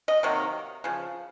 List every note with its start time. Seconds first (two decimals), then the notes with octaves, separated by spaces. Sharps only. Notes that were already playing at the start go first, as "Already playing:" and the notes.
0.08 D#5
0.23 C3 D#3 F#3 A#3
0.84 C#3 F3